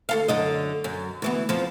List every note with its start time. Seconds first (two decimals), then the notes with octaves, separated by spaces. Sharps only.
0.09 D2 A4 F5
0.28 F#2 D3 D#5
0.84 F#2
1.22 D2 E3 B3
1.49 F2 F3